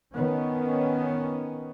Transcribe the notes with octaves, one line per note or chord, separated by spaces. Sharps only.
D#3 B3 C#4